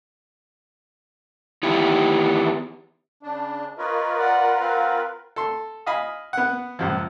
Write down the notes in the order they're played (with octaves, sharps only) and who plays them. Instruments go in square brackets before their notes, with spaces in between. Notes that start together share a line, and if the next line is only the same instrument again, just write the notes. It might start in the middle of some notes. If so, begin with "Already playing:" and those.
[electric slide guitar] D#3 E3 B3 E4 G4
[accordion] C#3 D4
[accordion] F4 A#4 B4 [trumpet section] C#5 D#5
[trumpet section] D5 F#5
C4 F5 F#5
[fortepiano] A4 C6
D#5 F5 G#5 B5 D#6
B3 F#5
C#2 F#2 F3